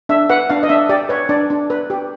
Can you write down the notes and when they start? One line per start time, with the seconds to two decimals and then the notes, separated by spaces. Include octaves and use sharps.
0.09 D4 E5
0.29 B4 F#5
0.50 D4 F5
0.63 D#5
0.69 D4 E5
0.89 G4 D5
1.09 B4 C#5
1.29 D4 D5
1.50 D4
1.70 B4
1.90 G4